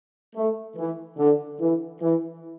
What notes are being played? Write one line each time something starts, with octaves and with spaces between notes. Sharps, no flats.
A3
E3
D3
E3
E3